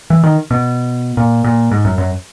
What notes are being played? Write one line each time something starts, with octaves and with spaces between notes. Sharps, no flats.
E3
D#3
B2
A#2
A#2
G#2
F#2
F#2